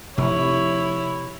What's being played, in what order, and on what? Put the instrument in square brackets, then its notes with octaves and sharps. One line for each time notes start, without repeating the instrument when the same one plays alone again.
[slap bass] F1 [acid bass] C3 [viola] E4 C#5